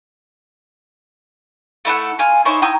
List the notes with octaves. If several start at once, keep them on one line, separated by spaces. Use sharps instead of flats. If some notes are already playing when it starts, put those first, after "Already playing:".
A3 E4 A4 F#5
F4 F5 G#5
D#4 E4 C5 C#5
E4 G5 A#5 D#6